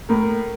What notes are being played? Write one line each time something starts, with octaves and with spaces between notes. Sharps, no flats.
A2 A#4